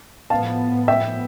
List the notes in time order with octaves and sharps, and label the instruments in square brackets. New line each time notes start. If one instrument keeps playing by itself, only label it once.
[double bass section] A2 F3 B3 [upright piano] F5 A5
[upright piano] E5 G5